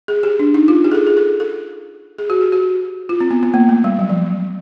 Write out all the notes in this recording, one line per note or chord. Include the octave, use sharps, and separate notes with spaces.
G#4
G4
D4
D#4
F4
G4
G#4
A4
G#4
A4
A4
G#4
F#4
G4
F#4
F4
C4
B3
B3
A#3
A3
G3
F#3
F3